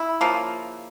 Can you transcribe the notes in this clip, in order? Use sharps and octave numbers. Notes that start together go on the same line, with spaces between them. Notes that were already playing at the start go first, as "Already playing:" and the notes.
Already playing: E4
C#3 F3 A#3